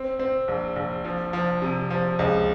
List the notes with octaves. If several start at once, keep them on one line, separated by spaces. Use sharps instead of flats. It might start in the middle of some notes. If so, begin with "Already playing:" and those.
Already playing: C4
C4
A#1
A#1
F3
F3
C3
F3
C#2